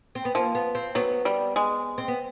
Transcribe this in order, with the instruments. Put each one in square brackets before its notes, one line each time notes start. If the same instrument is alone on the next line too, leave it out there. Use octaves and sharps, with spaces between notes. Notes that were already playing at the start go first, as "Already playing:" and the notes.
[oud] C4
B3
[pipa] F3 [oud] A#3
[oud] B3
C4
[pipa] F#3 [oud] B3
[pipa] G3
G#3
[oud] C4
B3